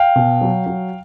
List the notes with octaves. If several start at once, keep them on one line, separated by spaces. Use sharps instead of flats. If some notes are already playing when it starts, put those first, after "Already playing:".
Already playing: F5 G5
B2
F#3
F#3